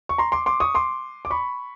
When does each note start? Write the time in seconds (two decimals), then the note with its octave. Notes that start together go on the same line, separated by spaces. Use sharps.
0.09 C#6
0.18 A#5 C6
0.32 C6 D6
0.46 C6 D6
0.60 C#6 D#6
0.75 C6 D6
1.25 D6
1.30 B5 C#6